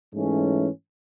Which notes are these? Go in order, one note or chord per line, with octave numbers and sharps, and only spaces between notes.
G#2 E3 A3 C#4